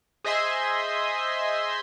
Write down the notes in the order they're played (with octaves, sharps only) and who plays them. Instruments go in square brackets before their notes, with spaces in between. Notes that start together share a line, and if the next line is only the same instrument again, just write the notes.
[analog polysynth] G#4 C5 D#5 E5 G#5 C6